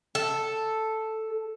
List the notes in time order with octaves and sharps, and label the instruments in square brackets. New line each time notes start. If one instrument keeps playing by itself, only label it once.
[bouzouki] A4